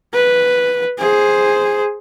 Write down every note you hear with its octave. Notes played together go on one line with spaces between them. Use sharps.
B4
G#4 C5